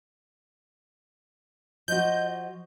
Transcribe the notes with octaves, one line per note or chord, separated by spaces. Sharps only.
F3 F#4 D#5 G6